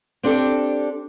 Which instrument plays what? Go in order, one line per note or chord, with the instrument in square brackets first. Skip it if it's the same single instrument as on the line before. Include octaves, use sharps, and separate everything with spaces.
[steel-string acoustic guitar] C4 D4 G4 A4